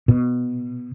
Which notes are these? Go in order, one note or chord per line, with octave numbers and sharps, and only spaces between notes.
B2